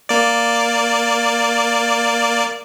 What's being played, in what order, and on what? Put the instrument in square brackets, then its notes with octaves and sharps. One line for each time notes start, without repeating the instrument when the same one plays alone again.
[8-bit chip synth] A#3 D5